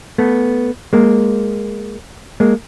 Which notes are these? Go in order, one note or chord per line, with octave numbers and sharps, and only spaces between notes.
A3 B3
G#3 A#3
G#3 A#3